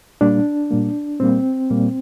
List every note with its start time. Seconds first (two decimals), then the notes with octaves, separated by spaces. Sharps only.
0.21 A#2 G3 A#3 D4
0.71 A#2 G3 A#3
1.20 A#2 G3 A#3 C4
1.70 A#2 G3 A#3